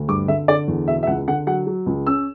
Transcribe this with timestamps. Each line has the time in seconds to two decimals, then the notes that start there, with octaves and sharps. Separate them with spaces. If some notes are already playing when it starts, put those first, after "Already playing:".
Already playing: D2
0.08 G2 D6
0.28 D3 E5
0.48 D3 D5
0.68 E2
0.88 B2 E5
1.03 E5
1.07 C#2 F#5
1.28 D3 F#5
1.47 F#3 F#5
1.67 F#3
1.86 C#2
2.07 C#4 E6